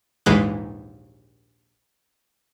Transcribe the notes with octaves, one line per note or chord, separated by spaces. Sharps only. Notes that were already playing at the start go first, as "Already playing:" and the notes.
A#1 D#2 G#2 E3 G#3 F#6